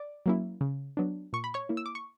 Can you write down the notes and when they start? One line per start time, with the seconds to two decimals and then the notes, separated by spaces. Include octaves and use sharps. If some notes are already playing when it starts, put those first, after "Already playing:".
Already playing: D5 D6
0.26 F#3 A#3 C#4 E4
0.61 C#3
0.97 F#3 B3 D4
1.33 A#2 C#6
1.44 B5
1.54 C#5 C#6
1.69 A#3 E4
1.77 E6
1.86 D6
1.95 C#6